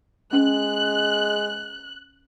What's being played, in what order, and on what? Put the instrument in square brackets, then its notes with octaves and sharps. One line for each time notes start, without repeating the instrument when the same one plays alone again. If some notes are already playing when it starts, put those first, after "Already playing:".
[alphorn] G#3 [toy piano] C#4 [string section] F#6